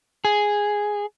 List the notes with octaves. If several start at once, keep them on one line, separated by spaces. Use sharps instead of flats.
G#4